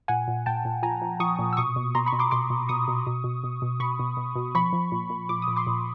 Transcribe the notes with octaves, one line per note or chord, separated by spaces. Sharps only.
A#2 F#5 G#5
A#2
A#2 G5 A5
A#2
F3 G#5 A#5
F3
F3 C#6 D#6
A#2
E6
B2 C#6 D#6
B2
B2 A#5 C6
B5 C#6
B2
C6 D6
B2 C6 D6
B2
B2 C#6 D#6
B2
B2
B2
B2
B2
B2 B5 C#6
B2
B2
B2
F3 B5 C#6
F3
A#2
A#2
A#2 D6
D#6
A#2
C6 D6
A#2